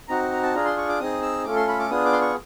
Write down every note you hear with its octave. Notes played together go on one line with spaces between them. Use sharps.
C4 D#4 F#4 A#5
A#5
A5
D4 F4 G#4 A#5
C6
C#6
D6
C4 D#4 G#4 D#6
E6
A3 C#4 F4 A4 D6
C6
B5
D6
B3 D4 F4 G#4 D#6
D6
C6
C#6